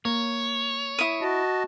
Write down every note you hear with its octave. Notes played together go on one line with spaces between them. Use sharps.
A#3 C#5
E4 D#6
F#4 D#5 A5